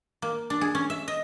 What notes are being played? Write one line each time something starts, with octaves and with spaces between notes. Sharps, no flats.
A#3
D4
G#4
C#4
E5
D#5